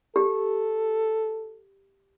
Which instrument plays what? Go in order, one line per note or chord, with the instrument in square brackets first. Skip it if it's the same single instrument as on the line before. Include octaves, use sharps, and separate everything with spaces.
[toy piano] G4 [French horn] A4